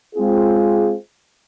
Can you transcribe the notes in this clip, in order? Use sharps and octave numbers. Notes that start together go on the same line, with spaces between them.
G#3 C4 F4 G#4